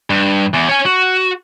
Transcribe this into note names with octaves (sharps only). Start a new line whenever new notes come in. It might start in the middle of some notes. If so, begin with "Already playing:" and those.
G2
E2
C#5 G#5
F#4